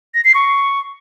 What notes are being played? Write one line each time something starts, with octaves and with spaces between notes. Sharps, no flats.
A#6
C7
C#6